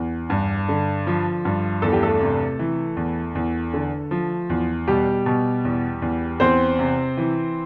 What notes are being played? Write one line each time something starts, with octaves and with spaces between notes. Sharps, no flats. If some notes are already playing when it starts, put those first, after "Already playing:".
Already playing: E2
G2
D3
F3
G2
E2 A4
G4
A3 A4
C3
E3
E2
E2
D3
F3
E2
B2 G3 G4
B2
E2
E2
E2 C4 C5
C3
E3